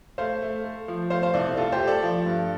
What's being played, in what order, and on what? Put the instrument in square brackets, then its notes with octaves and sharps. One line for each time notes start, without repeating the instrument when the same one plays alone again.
[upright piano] A3 C5 F5
A3
A3
F3
A3 C5 F5
C5 F5
C2 A4 D5
A3 F4 A4
G4 C5
A3
A4 D5
F3
G2